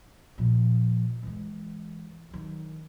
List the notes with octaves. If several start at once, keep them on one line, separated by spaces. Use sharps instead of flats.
A#2 F3
E3 G#3
D#3 F#3